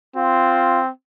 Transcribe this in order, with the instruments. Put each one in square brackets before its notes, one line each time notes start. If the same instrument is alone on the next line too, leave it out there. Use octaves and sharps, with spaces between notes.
[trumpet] C4 [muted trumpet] F4